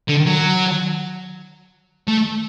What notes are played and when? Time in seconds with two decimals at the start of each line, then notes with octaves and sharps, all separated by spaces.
0.09 D3
0.27 F#3
2.08 A3